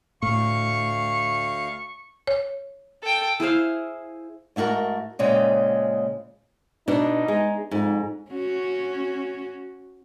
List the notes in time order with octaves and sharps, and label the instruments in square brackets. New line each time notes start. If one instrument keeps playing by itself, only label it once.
[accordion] D2 F5 [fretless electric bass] A2 [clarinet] C#6
[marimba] C#5
[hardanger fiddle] A4 G5
[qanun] E4 G#4 C5 F5
[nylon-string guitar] G#2 A3 E4 F#4 A#4
A#2 C#3 G#3 C4
[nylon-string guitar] B2 D4 [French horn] D#4
[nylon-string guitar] G#3
[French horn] F2 [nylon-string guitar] G#2
[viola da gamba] C#4 F#4